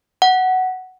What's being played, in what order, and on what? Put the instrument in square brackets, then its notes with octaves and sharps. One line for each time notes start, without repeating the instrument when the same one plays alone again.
[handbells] F#5